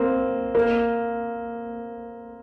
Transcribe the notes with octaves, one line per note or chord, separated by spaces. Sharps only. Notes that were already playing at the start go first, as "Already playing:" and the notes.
Already playing: A#3 C4
A#3